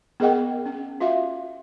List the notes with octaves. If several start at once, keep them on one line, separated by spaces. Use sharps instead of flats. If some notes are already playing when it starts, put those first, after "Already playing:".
B3 G#4 A#4 D#5 F#5 G5
C#4
F4 F#4 E5 F5